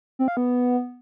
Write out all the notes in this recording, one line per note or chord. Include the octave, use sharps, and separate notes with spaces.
C4
F5
B3